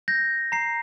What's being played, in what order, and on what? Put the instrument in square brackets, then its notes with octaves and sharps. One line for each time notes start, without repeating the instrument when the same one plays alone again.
[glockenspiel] G6 A#6
A#5 C7